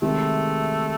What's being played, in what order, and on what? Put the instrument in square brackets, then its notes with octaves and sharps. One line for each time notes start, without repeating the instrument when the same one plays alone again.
[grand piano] C3 D#3 G#3 [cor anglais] A3